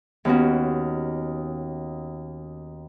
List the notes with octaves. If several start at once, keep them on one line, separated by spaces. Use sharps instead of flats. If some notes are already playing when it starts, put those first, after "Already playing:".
D#2 B3 C#4 F#4